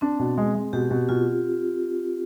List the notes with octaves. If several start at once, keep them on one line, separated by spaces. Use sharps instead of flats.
C4 D4
B2
G#3
G#3
B2 G4
B2
B2 F4